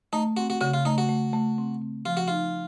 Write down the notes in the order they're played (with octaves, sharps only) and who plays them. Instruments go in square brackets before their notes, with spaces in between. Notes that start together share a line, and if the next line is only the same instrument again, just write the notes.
[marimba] A3 [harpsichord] D#4
[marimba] C4 [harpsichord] F#4
[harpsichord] F#4
[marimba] C#3 [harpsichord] F#4
[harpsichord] F4
[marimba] A3 [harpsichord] D#4
[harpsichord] F#4
[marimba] A3
A3
C4
C4
[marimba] F3 [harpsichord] F4
[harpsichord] F#4
[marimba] D#4 [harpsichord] F4